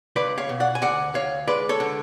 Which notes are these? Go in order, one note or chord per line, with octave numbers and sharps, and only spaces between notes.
C#2 B4 D5
C#5 F5
B2
D5 F#5
G#5
D2 D5 F#5
D2 C#5 F5
G#3 B4 D5
A4 C#5
D3